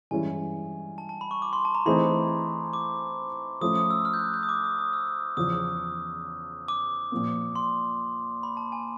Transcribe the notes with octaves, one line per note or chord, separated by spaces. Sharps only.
G2 E3 G#3 C#4 E4 G#5
A5
A5
B5
C#6
D6
C6
A5
A#5
E3 A3 C4 D#4 G#4 B5
D6
F3 A3 C#4 D#6
D#6
E6
F6
G6
F#6
G6
D#6
D6
D#6
D#6
E6
E2 C#3 F3 D#6
D6
A#2 F3 A#3
C6
B5
A5
G#5